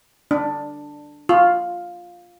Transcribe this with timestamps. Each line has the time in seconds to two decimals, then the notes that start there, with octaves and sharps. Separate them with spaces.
0.31 D4
1.29 F4